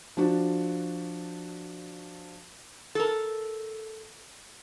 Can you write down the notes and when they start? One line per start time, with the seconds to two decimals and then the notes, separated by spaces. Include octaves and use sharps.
0.17 F3 D4 F#4
2.95 A4 A#4